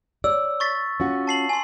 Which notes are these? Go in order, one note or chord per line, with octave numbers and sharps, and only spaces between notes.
C#5 D5 E6
C#6 A6 B6
C#4 F4 F#4
A5 C7 F#7
G#5 C6